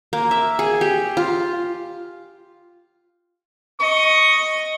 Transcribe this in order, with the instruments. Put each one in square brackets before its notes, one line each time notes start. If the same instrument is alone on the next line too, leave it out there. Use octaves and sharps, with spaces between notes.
[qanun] A#3
E5
G#4
G4
F4
[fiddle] D#5 [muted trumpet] C#6